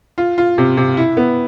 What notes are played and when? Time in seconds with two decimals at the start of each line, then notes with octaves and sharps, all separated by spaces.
0.18 F4
0.38 F4
0.58 C3
0.77 C3
0.97 E4
1.17 B3